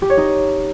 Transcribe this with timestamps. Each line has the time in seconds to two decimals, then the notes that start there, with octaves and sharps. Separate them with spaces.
0.02 G4
0.10 C#5
0.17 D#4